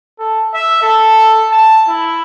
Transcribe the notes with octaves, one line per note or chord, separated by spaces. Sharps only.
A4
E5
A4
A5
E4